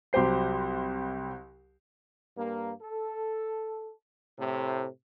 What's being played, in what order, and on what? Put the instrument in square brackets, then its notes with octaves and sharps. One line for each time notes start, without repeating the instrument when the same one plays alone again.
[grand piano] C2 F#3 G4 C5 C7
[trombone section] G2 A#3
A4
A2 C3